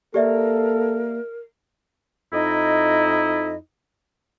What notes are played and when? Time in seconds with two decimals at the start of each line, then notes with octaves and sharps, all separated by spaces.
0.14 A#3 G4 A4 A#4 D5 E5
2.33 F2 D#4 E4 D#5